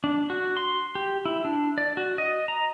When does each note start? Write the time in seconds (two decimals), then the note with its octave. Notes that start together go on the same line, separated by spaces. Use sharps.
0.04 D4
0.30 F#4
0.57 C6
0.95 G4
1.25 E4
1.45 D4
1.78 D5
1.97 F#4
2.18 D#5
2.48 A#5